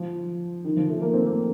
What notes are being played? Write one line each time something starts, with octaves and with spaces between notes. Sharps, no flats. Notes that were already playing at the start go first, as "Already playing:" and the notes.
Already playing: F3
D#3
F3
A3
A#3
C4
A#3